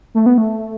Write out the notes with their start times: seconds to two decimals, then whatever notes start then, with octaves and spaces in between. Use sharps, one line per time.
0.15 A3
0.26 B3
0.38 A3